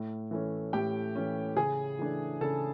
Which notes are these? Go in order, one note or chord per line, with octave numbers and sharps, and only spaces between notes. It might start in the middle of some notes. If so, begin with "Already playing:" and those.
Already playing: A2
E3 A3 C#4
A2 G4 G5
E3 A3 C#4
C#3 G#4 G#5
E3 A3 D4
C#3 A4 A5